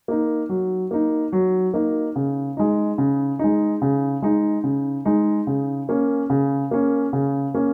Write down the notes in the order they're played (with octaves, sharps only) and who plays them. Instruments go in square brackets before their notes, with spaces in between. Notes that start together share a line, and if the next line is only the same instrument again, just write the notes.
[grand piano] A#3 D#4
F#3
A#3 D#4
F#3
A#3 D#4
C#3
G#3 D#4
C#3
G#3 D#4
C#3
G#3 D#4
C#3
G#3 D#4
C#3
A#3 C#4
C#3
A#3 C#4
C#3
A#3 C#4